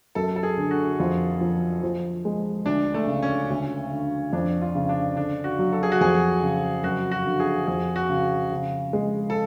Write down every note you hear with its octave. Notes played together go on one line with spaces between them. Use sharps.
F#2 A4
A4
G#4
D3
F#4
F2 F4
F3
F3
G#3
D2 D4
A3
C#3
C#4
D2
D3
F2 D4
F4
C#3
D4
D3 D4
F#4
F#3
A4
G#4
F#4
F2 G#4
C#3
F#2 F#4
F#4
D3
G#4
F2 G#4
F#4
C#3
C#3
G#3
A4